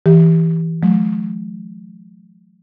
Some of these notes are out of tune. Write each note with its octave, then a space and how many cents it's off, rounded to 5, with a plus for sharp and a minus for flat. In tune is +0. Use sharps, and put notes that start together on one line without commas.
E3 -5 G4 +0
F#3 -35 A3 -45